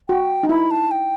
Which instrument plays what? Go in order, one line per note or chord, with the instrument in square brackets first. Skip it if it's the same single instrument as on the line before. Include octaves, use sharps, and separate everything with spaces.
[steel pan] F#4 [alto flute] G5
[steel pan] D#4
[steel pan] E4 [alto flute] B5
[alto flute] A5
G5